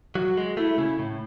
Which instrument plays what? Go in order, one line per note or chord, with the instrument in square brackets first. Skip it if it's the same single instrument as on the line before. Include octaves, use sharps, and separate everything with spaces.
[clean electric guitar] F#3 [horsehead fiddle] F#4
[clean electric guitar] G#3
[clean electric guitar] A3 [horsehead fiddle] E4
[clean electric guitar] C#3
A2